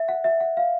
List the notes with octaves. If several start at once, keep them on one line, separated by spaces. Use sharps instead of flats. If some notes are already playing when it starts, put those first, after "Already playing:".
Already playing: E5
F#5
E5
F#5
F5